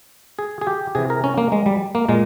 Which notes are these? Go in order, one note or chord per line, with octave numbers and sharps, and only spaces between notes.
G#4
G#4
G4
C3 E3 G#4
A#4
C#4
A#3
G#3
G3
A#3
A#2 G#3